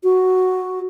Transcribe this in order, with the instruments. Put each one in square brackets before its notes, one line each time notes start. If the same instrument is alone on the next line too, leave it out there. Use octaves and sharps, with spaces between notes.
[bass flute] F#4